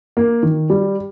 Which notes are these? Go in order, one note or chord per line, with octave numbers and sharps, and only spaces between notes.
A#3
D#3
G3